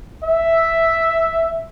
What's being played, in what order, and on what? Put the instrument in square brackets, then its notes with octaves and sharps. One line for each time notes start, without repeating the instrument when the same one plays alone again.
[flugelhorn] E5